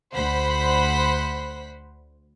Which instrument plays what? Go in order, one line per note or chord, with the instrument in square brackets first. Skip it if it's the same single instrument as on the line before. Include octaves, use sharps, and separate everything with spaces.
[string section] D2 C5 F#5 B5 B6